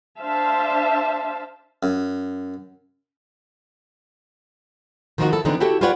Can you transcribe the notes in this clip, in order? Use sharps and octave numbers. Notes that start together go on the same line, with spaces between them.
D4 C5 E5 F5 A5
F#2
D#3 F3 A#3 B3 D#4 F#4
E4 A4
D3 E3 F3 B3 C4 D#4
E4 F#4 G4 A4 C#5 E5
F4 G4 B4 C#5 D5 F#5